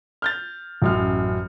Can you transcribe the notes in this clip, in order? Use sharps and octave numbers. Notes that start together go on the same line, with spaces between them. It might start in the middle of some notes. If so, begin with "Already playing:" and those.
F6 G6 A6
A1 F#2 F6